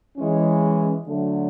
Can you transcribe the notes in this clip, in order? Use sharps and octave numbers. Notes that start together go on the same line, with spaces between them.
E3 G#3 C#4
D3 F#3 A3